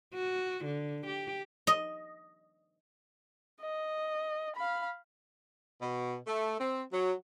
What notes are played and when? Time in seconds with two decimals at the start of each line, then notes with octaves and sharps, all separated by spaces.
0.14 F#4
0.65 D3
1.07 G4
1.67 D#5
3.61 D#5
4.56 F5 B5
5.80 B2
6.26 A3
6.59 C4
6.92 F#3